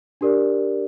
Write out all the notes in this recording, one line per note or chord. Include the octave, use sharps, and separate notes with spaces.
D4 G4 A#4 D5